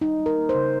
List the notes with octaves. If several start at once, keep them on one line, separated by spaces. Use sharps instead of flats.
G3 D#4
G3
A#4
A#3
C5
C#3